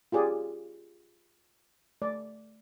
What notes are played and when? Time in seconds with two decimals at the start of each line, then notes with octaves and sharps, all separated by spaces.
0.12 F4 G4 G#4 D5
2.02 A3 D5